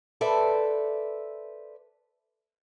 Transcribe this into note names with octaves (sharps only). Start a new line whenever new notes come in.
A4 B4 C5 D5 E5